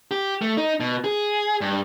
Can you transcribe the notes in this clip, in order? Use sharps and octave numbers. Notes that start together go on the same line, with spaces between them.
G4
A3
D#4
B2
G#4
G2